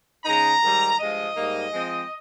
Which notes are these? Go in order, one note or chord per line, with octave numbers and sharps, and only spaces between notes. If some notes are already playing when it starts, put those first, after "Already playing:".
C#3 G#3 D#4 A#5
G#2 D#3 G3
G2 F3 G#3 D#5
G#2 G3 A#3 D#4
F3 G#3 C4